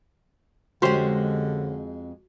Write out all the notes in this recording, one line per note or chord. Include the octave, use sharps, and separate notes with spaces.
F2 D3 G#3 C#4 F#4 G4 C5